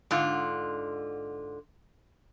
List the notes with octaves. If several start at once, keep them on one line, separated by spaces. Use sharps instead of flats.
G#2 D3 F4